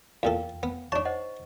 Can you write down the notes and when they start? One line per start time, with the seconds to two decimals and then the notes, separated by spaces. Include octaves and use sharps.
0.23 E2 A#2 A4 F5 G5
0.63 B3
0.92 D4 D#4 C#5 A5 C#6
1.05 C5 D#5 F#5